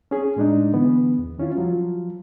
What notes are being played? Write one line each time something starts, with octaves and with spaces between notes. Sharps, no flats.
C#4 G#4
A2 G#3 D4 D#4
D3 E3 B3
E2
D#3 C#4 E4 F4
F3 F#3 F4